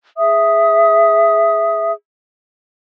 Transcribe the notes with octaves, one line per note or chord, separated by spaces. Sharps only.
G#4 E5 D#6